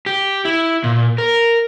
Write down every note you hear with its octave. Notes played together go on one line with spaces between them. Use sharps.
G4
E4
A#2
A#4